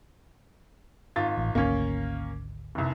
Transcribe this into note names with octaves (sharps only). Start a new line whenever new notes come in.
G#1 F4 A6
A1
G#1 D2 A#3 C#4
F1 C2